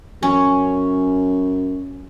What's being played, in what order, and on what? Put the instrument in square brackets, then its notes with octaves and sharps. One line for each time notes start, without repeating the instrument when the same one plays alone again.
[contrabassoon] F#2 [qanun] C#4